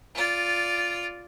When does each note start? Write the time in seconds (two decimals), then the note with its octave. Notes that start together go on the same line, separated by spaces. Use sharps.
0.15 F4 D5